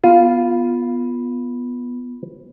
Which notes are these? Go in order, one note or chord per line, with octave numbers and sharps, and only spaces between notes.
B3 F4